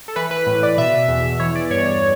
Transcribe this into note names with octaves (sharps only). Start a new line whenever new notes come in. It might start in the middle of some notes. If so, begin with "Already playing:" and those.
A4
E3 B4
B4
A2
D5
B2 E5
E2
E3 C#5
D5
G2 C#5
C#5